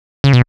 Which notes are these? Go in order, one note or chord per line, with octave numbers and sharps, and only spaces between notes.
C#3
B2